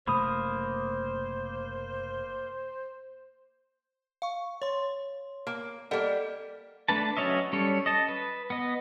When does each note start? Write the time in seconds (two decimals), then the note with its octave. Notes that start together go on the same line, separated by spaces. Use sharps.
0.07 F#1 C3 A3 A#3 A#4 C5 B5 D#6
4.22 F5 C#6
4.62 C#5 C6
5.47 A#3
5.91 G3 A#3 A4 D#5 F#5
6.88 A3 D4 B4 A5
7.17 F#3 C#4 C#5 D#5 E5
7.53 G3 C#4 A4 C#5
7.86 D#5 A5
8.08 B4
8.50 B3 D#5